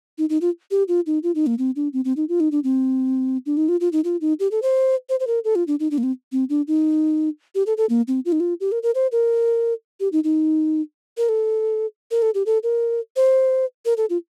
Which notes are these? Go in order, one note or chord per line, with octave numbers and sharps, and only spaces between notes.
D#4
D#4
F4
G4
F4
D#4
F4
D#4
A#3
C4
D4
C4
C4
D#4
F4
D#4
D4
C4
D4
D#4
F4
F4
D#4
F4
D#4
G4
A4
C5
C5
C5
A#4
A4
F4
D4
D#4
D4
A#3
C4
C4
D4
D#4
G4
A4
A4
A#3
C4
F4
D#4
F4
G4
A#4
A#4
C5
A#4
G4
D#4
D#4
A#4
A4
A#4
A4
G4
A4
A#4
C5
A#4
A4
F4